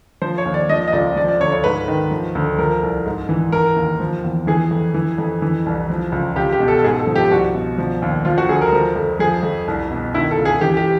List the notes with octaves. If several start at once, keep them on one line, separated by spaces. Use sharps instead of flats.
F3 C5
C#5
D#2
D5
F3 D#5
D#5
C#2 D5
F3 D5
D5
D2 C#5
C#5
G#2 B4
D#3
F3
D2
F3 A#4
C2
G#2
E3
E3 A#4
D#2
F3
E2
E3 G#4
F2
E3
F2
E3
C2
F3
C#2
C#2 G4
G4
B2
A4
A4
G#2 G#4
A4
F3
G4
C2 F#4
B2
F3
D#2
F3 F4
F#4
D2 G#4
A#4
F3
F2
F3 G#4
F2
C2
B2
D#3 E4
A4
C#2
G#4
E3 G4
G4